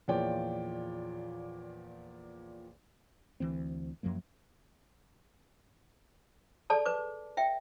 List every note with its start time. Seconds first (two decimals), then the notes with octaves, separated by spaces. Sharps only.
0.08 E2 A#2 F3 C#5 D5 G5
3.40 D2 E3 G3 C4
4.03 F#2 F3 F#3 A#3
6.70 G#4 A4 D5 A5
6.86 B4 D6
7.37 E5 G5